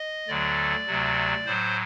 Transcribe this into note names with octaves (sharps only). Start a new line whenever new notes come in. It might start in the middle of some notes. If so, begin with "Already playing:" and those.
Already playing: D#5
D2 D3 F#3 D5
D2 C3 F#3
A2 F#3 C5